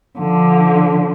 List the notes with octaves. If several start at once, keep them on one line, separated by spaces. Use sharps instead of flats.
D3 F3